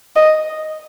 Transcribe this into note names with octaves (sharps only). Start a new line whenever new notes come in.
D#5